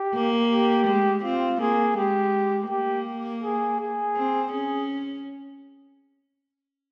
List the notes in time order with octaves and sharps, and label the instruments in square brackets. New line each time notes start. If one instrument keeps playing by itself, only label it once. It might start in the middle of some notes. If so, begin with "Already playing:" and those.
Already playing: [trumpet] G4
[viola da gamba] A#3
[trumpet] G4
[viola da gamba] G#3
[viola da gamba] C4 [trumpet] F4
[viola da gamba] A#3 [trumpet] G#4
[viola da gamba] G#3 [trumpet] G4
[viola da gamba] A#3 [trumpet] G4
[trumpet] G#4
G#4
[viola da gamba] C4
[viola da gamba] C#4 [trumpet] G#4